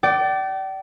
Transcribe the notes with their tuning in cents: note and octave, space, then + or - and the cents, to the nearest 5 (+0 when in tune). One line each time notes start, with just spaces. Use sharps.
D5 +0 G5 -40